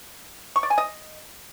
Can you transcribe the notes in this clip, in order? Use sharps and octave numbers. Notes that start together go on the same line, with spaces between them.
C#6
D5
G#5
D#5